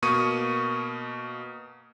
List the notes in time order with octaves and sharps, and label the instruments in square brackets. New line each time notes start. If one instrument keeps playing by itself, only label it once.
[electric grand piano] B2 A#3 C#6 D#6 D#7